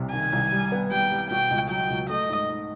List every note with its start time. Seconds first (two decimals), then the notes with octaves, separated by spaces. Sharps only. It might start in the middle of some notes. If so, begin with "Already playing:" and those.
Already playing: C2 C3
0.13 D#3 G#5
0.33 C2
0.52 G3
0.72 B3
0.91 G3 G5
1.12 G3
1.31 B2 G5
1.51 C#2
1.70 F#3 G5
1.90 C#2
2.10 A3 D#5
2.29 G#2
2.49 G#2